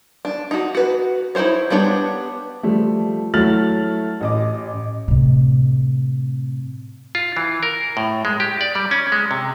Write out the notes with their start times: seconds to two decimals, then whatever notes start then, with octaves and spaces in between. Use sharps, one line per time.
0.25 D4
0.51 D#4 F#4
0.75 F#4 B4
1.35 D#4 E4 F#4 C5 C#5
1.70 G3 B3 D4 C#5
2.63 F3 G3 A3
3.34 F#3 A3 E4 F6 A6 F#7
4.21 A1 D#5 D6
5.08 A2 C3
7.15 F4
7.37 E3
7.63 A#4
7.97 A2
8.25 G#3
8.40 G4
8.61 D5
8.75 G3
8.91 C#4
9.12 G#3
9.31 C3